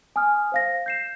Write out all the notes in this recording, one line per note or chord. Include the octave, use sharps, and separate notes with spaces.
G#5 D#6 F6
C5 F5 A#6
G6 C7 E7